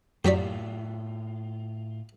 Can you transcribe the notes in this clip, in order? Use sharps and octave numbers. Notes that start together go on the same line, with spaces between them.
F#2 A2 F#3 F4 G4 D5 B6